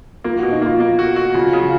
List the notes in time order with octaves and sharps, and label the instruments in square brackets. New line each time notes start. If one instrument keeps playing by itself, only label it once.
[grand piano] A#3 [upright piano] F4
[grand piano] B2 [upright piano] F#4
[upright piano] D#4
[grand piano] A#3 [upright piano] F4
[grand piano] A#3
F#4
F#4
[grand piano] C#3 [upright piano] F4
[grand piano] C#3
[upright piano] F4